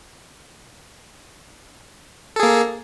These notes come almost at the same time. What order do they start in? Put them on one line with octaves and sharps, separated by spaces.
A4 G#4 A#3